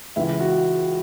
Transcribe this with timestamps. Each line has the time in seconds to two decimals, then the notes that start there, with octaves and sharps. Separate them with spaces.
0.16 C#2 C#3 E3 E4
0.40 F#4